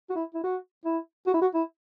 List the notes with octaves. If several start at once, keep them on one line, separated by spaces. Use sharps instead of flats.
F#4
E4
E4
F#4
E4
F#4
E4
F#4
E4